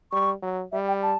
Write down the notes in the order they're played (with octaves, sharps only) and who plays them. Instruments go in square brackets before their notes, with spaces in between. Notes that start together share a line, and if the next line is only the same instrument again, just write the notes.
[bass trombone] G3 [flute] C#6
[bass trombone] F#3
[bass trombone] G3 [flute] E5
[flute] G5
A5